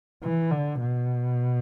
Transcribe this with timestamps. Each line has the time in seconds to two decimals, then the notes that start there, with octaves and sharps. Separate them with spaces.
0.23 E3
0.51 D3
0.80 B2